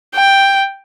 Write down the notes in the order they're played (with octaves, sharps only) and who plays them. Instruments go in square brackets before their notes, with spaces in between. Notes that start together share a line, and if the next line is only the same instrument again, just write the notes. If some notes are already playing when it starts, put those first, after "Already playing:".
[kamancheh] G5